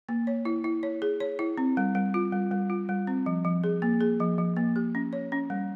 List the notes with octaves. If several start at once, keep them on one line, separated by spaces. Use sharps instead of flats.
A#3
C#5
E4
E4
C#5
G#4
C#5
E4
C4
G3
G3
F4
G3
G3
F4
G3
C4
F3
F3
G#4
A#3
G#4
F3
F3
A#3
G4
C#4
C#5
C#4
G3